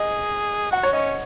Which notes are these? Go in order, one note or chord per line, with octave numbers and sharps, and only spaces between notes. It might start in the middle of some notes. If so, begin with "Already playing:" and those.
Already playing: G#4 D#5
F#4 F#5
C#5
C#4 D#5